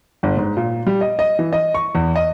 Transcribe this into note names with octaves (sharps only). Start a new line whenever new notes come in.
G1
G#2
A#2
G3
D#5
D#5
E3
D#5
C#6
E2
D#5